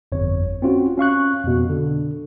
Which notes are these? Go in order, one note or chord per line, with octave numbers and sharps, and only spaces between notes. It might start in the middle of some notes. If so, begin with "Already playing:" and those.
G1 F2 C#5
C4 C#4 F4 F#4
C#4 F5 C#6 F#6
F2 B2
D3